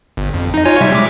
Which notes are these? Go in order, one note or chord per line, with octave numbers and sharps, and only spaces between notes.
G1
F2
D#4 D#5
F4 C#5 G#5
C3 G3 E5
G#3 D6 B6